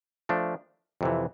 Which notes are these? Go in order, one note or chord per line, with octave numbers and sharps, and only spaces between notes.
F3 A3 D4
F2 C3 E3